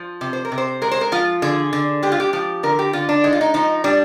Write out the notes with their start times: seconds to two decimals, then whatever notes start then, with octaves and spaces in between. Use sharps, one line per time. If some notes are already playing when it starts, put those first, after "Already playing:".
Already playing: F3
0.21 C3
0.33 C5
0.45 A#4
0.52 C3
0.58 C5
0.82 G#3 A#4
0.92 C5
1.01 A#4
1.12 F3 F4
1.42 D3 G#4
1.73 D3
2.03 G#3 G4
2.12 F4
2.20 G4
2.33 F3 G4
2.63 D3 A#4
2.79 G4
2.93 D3 F4
3.09 D4
3.24 G#3 D#4
3.33 F4
3.41 D#4
3.54 F3 D#4
3.84 G3 D4